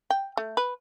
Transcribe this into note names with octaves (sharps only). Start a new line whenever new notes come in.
G5
A3
B4